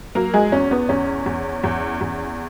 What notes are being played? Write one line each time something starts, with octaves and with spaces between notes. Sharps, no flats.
F#3 A#3 A#4
G#3 G#4
E2 C#4
B3
E2 C#4
E2
E2
E2